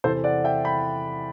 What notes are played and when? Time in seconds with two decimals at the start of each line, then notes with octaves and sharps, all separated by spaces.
0.04 E2 C3 E3 A4 C5
0.24 D5 F#5
0.44 E5 G5
0.65 G5 B5